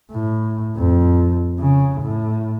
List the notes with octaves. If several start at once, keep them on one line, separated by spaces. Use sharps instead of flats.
A2
F2
C#3
A2